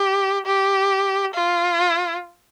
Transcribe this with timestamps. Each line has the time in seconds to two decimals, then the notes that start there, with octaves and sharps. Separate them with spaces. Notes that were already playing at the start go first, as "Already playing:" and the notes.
Already playing: G4
0.46 G4
1.35 F4